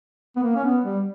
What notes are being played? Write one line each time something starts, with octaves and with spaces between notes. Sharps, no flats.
B3
A#3
C#4
B3
G3